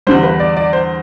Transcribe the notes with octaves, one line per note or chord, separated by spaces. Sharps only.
E2 D3 G3 C5
B4
D5
D5
C5